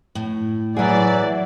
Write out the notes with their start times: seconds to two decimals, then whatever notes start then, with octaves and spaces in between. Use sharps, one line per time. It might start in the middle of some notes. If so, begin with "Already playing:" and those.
0.15 A2
0.76 E3 F#3 F#4 G#4 D5 E5